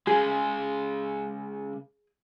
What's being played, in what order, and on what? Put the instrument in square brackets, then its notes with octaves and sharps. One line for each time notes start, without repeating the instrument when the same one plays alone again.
[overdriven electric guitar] C#3 G#3 [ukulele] G#4